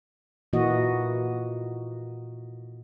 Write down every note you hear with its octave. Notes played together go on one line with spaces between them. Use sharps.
A#2 E3 A#3 F#4 D#5